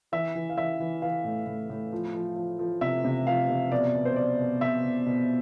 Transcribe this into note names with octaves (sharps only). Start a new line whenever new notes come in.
E3 E5
E3
F5
E3 E5
E3
E3 F5
A2
A2
A2
F3
F3
F3
F3
C3 E5
C3
F3 F5
C3
B2 D5
B2
C5
B2 D5
B2
B2 E5
B2
B2